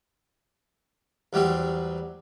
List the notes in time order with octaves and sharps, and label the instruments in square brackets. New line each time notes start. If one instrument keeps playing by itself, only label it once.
[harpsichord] E2 F#3 G3 C4 F#4